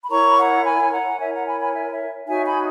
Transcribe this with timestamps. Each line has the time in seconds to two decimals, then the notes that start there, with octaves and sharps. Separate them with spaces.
0.03 B5
0.10 E4 A#4 C#5 A#5 C#6
0.28 B5
0.38 F#5 A#5
0.65 G#5 B5
0.92 F#5 A#5
1.19 E4 A#4 C#5 E5 G#5
1.32 F#5 A#5
1.46 G#5 B5
1.59 G#5 B5
1.73 E5 G#5
1.91 C#5 E5
2.27 D#4 F#4 C#5 E5 G#5
2.45 G#5 B5